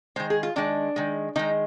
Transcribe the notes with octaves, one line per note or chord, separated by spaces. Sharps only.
D#3 G#3 C5
G#4
F4
D#3 G#3 D4
D#3 G#3
D#3 G#3 D#4